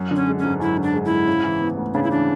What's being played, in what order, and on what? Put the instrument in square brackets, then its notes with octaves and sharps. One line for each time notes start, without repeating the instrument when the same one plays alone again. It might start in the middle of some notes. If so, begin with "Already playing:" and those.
Already playing: [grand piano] F#2
[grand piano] D3 [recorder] C#4
[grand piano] G#3
[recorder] C#4
[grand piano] G#1
[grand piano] F#2 [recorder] E4
[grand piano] D3
[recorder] D4
[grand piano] G#3
[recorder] E4
[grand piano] G#1
C#3
E3
B3
D2
[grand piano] C#3 [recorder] D4
[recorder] E4
[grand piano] E3 [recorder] D4